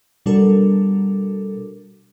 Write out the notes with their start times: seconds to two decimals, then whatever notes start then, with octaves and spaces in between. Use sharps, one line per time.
0.26 B2 G3 D4 F#4 A4 A#4